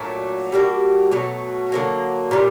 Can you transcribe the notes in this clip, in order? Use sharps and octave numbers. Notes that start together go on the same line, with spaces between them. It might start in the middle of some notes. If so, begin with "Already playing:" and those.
Already playing: A#2 F#3 A3 D4
G3 A#3 D4 F#4
B2 F#3 A3
D3 F#3 A#3
A#2 G3